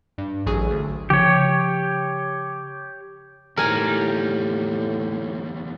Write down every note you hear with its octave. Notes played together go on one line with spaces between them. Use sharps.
G2
A1 F#3 G#4
D2
C#3 F3 G4 C#5
E2 A2 D#3 G3 A#4 G#5